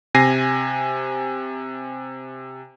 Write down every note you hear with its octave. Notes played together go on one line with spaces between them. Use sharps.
C3 G#5 A#6 C7 D#7